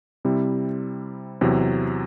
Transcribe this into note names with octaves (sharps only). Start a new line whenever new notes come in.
C3 G3 C4 E4
E2 C3 F#3